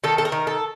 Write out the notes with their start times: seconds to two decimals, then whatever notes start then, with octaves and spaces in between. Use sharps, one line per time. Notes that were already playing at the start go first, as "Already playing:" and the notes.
0.04 D#3 A4
0.18 A4
0.25 A#4
0.32 D#3
0.47 A4